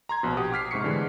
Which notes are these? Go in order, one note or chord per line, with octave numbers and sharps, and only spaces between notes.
A#5 C6 G#6
A#1 B2
G4 F#5 D#6
D6 F6 B6 C7
G#2 C3 C#6 C7 C#7
D3 E3 G#3